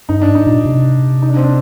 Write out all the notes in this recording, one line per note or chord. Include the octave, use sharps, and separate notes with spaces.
G2 D#4
D4
G#2
D#4
A#2
C3
D#4
D4
C4
D4